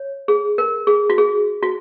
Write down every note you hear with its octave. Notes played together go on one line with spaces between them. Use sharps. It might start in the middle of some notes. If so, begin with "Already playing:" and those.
Already playing: C#5
G#4
A#4
G#4
F#4
G#4
F#4